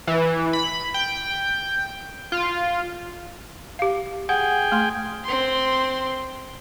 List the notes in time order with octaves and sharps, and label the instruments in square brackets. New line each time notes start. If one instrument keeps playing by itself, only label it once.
[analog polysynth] E3
B5
G5
F4
[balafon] G4 F5
[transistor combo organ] G#4 G5 [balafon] F#5
[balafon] A3 C6
[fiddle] C4 C6